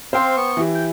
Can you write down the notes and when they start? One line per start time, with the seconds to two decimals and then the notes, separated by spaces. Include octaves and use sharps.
0.13 C4 C5 F5 G5
0.37 B3 C#6
0.57 E3 G4
0.75 G5